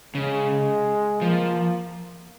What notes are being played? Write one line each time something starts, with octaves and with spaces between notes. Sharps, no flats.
C#3 G#3
F3 A#3